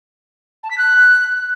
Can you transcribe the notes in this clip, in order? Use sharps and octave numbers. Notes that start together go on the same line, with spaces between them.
A5
B6
F#6